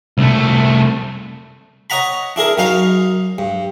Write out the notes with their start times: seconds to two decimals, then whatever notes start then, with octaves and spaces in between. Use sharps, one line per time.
0.18 C2 A3
1.90 C#5 D#5 F#5 A#5 B5
2.36 D4 E4 G#4 A#4
2.58 F#2 C#4 D#4 D#5 F5
3.38 G2